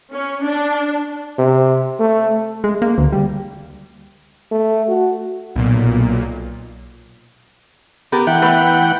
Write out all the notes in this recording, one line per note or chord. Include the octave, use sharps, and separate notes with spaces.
C#4
D4
C3
A3
G#3
A#3
D2
G3
A3
F#4
B1 A#2
B3 G4 A#4
E3 E5 F#5 G5
A3 B3 B4